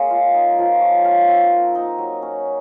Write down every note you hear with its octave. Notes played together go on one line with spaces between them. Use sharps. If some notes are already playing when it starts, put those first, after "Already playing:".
Already playing: G#3 A#3 C#4
F4
D#4
F3
C#5
F5
C4
A#4
D#4
F#3
C#4